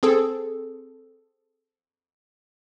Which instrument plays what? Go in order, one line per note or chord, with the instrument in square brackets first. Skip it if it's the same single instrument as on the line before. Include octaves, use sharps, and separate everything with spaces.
[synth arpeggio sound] C4 G#4 A4